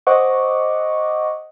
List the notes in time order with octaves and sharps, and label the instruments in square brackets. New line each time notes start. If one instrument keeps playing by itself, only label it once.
[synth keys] C5 D#5 F#5 C#6 D6